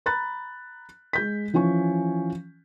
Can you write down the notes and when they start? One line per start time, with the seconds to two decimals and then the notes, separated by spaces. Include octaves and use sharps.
0.06 A#5 B5 F#6 A6
1.13 G#3 G6 B6
1.53 E3 F3 C#4 G#5 C#6